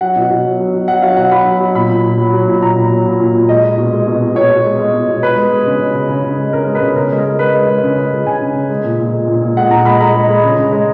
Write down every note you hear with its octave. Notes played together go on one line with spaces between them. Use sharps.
F#3 F#5
B2
B2
F#3
F#3
F#3
F#3 F#5
F#3 F5
B2 F#5
F#3 B5
F#3
F#3
A#2 B5
A#2
A#2
F#3
F#3
A#2
A#2 A#5
A#2
F#3
A#2
A#2
A#2
G#3 D#5
G#3
B2
G#3
B2
B2
B2 C#5
B2
G#3
G#3
B2
B2
G#3 B4
G#3
G#3
C#3
C#3
C#3
C#3
C#3
G#3
C#3 A#4
G#3
B4
C#3
C#3 A#4
G#3
A#4
G#3
G#3 B4
G#3
G#3
C#3
G#3
G#3
C#3 G#5
C#3
C#3
G#3
A#2
A#2
G#3
A#2
A#2
G#3 F#5
A#2 A#5
G#3 B5
G#3 A#5
G#3
G#3
C#3
C#3
G#3